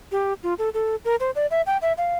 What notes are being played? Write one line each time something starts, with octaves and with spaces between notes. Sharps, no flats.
G4
F4
A4
A4
A#4
C5
D5
E5
G5
E5
F5